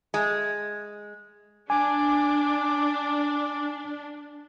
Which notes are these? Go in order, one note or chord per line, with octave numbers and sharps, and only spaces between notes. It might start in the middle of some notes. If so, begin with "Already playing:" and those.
G#3
D4 G#5 D6